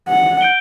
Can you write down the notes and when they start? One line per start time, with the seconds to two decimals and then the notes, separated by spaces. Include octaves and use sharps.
0.08 F#5
0.41 G6 D7 G7